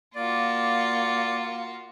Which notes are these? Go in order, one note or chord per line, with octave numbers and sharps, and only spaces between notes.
A#3 F4 F#4 D5